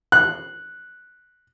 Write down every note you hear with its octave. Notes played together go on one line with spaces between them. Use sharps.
F#6